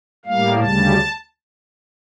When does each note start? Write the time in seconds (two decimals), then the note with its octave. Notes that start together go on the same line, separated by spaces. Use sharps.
0.25 A2 G3 A#3 F5
0.59 D2 C#3 G3 A5